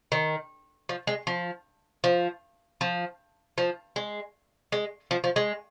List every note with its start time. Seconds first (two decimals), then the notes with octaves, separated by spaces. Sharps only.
0.12 D#3
0.89 F3
1.07 G#3
1.27 F3
2.04 F3
2.81 F3
3.58 F3
3.96 G#3
4.72 G#3
5.11 F3
5.24 F3
5.36 G#3